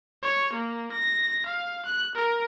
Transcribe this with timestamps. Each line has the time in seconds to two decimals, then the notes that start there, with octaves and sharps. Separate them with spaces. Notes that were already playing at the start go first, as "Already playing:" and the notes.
0.23 C#5
0.53 A#3
0.92 A#6
1.46 F5
1.86 F#6
2.15 A#4